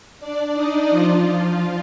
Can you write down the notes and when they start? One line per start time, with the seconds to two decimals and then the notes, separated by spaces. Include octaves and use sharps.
0.20 D4 D5
0.55 D#4 D#5
0.90 F3 F4